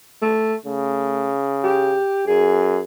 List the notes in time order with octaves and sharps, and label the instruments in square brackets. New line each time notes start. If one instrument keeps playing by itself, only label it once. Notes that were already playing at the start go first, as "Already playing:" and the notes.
[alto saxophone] A3
[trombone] C#3 [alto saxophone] A3
[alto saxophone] G4
[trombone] F#2 [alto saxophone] G#4